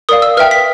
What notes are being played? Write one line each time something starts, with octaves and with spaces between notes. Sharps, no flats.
A#4 D5 F5 D#6
E6
B4 E5 G5 F6
B6